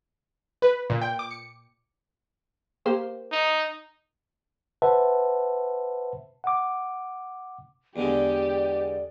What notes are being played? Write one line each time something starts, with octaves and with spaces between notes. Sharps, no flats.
B4
A#2
G5
D6
C#7
A#3 G4 C5
D#4
B4 C5 E5 F#5 A5
F#5 D6
E2 D3 G#3 G4 D5